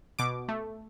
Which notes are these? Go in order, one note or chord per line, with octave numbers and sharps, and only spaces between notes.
B2 D6
A3